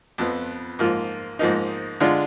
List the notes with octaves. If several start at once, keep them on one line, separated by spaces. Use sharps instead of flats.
F2 F3 B3
G#2 F3 A#3 F4
G#2 F3 A#3 D#4
D3 G#3 D4 F4